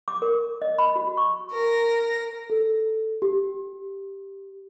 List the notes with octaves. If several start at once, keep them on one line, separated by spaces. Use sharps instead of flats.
D6
A#4
D#5
B5
F#4
C#6
A#4 A#6
A4
G4